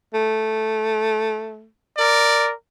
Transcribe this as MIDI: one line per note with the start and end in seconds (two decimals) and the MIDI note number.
0.14 1.68 57
1.97 2.51 70
1.97 2.51 74